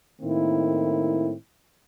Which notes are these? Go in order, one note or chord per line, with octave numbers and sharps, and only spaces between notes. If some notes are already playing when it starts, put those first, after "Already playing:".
A2 D#3 A#3 C4 E4